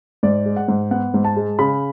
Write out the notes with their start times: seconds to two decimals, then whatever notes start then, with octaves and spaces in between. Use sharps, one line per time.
0.23 G#2 D5
0.45 G#3
0.57 F#5
0.68 G#2
0.91 B3 F#5
1.14 G#2
1.24 A5
1.37 G#3
1.59 C#3 B5